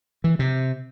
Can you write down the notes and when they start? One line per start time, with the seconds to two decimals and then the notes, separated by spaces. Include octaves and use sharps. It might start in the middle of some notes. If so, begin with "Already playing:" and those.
0.24 E3
0.39 C3